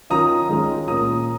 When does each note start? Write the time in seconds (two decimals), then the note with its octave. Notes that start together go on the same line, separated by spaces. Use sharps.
0.10 D#3 C#4 F4 A#5 D#6
0.49 D#3 G#3 C#4 F4
0.87 A#2 A#3 C#4 F4 A#5 D#6